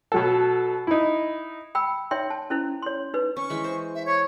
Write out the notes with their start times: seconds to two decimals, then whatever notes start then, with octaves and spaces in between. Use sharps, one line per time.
0.12 B2 F#3 A4
0.87 D#4 E4
1.75 G5 B5 E6
2.11 D#4 C#5 E5 G5 C6
2.30 A5
2.50 C#4 E4 C5
2.82 C#5 C6
3.14 D#4 B4
3.37 C#4 C#6
3.50 E3 G#3 B5
3.64 C5
3.95 E5
4.07 C#5 C#6